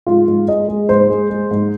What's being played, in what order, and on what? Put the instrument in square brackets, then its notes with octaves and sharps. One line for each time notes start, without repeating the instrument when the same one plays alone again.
[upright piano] G#2 F4
G#2
G#3 D#5
G#3
G#2 C5
G#3
G#3
G#2